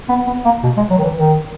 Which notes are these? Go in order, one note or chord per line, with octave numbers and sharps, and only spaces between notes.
B3
B3
A#3
B2
G#3
F#3
D#3
E3
D#3